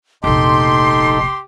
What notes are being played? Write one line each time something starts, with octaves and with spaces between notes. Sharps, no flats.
F1 A#1 D#4 G4 A4 C6